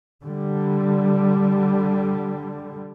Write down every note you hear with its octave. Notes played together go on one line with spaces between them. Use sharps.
D3 G3